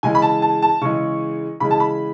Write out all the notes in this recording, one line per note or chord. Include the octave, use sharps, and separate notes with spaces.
C#3 E3 G#3 G#5
B5
A5
A5
A5
C#3 E3 G#3 C#6
C#3 E3 G#3 B5
A5
B5